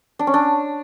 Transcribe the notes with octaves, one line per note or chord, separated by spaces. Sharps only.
D4
C#4
D4